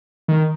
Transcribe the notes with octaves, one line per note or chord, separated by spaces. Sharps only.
D#3